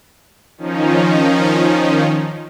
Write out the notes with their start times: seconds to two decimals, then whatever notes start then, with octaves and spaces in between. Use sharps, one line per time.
0.58 D#3 F3 C#4 D#4